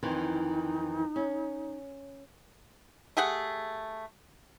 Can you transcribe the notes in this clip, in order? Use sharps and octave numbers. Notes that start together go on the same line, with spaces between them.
F2 D#3 E3 D#4
C#4
A3 G4 G#4 F#5